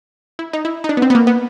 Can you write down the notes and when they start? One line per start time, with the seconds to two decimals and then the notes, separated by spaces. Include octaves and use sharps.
0.39 E4
0.53 D#4
0.65 E4
0.84 D#4
0.89 D4
0.97 B3
1.02 C4
1.10 B3
1.15 A#3
1.27 B3